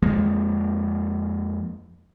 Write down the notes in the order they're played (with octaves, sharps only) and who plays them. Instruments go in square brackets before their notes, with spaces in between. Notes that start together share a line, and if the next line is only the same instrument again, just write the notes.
[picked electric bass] F2 F3 G#3 A#3